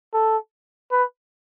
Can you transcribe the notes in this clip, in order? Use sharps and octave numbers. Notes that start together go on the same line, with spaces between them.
A4
B4